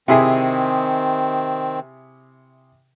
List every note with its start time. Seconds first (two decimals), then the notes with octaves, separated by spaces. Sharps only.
0.08 C3 D#3 C4 E4 G#4